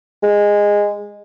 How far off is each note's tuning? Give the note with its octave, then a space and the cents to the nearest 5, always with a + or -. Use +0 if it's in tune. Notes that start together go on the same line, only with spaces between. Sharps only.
G#3 -15